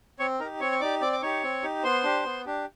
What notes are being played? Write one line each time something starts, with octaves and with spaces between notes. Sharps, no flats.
C4 C#5 C#6
D#4 G4 A#4 A#5
C4 C#5 C#6
C#6
D#4 G4 D5 D6
C4 D5 D6
D6
D#4 G4 C#5 C#6
C4
D#4 G4
B3 C5 C6
D4 G4
B3
D4 G4